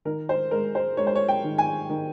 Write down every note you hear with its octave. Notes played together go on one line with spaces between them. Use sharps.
D#3 A#4
C5
G#3 A#4
C5
G#3 C#5
C5
C#5
G5
D#3
G#5
D#3